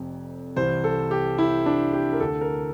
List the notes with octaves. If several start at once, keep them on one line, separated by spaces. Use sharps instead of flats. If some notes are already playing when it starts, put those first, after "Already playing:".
Already playing: F1 F2 C3
C2 C3 E3 C5
A4
G4
E4
D4
G4
A#4
D2 D3 A4
A#4